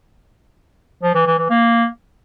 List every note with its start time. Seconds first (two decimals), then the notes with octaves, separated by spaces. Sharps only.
1.03 F3
1.14 E3
1.26 E3
1.38 E3
1.50 A#3